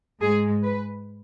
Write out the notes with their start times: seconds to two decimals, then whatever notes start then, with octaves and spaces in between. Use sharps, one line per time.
0.21 G#2 G#3 G#4
0.63 B4